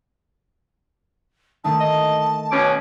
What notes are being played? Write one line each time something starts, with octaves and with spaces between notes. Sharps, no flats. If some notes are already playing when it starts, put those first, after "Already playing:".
D#3 A3 D#4 A5
D#5
B2 C#4 D6